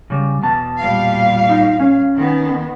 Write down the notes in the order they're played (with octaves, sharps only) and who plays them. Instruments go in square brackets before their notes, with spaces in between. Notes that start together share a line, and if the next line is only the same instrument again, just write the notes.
[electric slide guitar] C#3 G3
E2 B2 A5
[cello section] A#2 G3 F5
[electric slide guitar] D#4
C#4
[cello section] D#3 B3